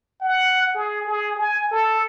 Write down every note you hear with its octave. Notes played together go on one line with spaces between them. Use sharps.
F#5
G#4
G#4
G#5
A4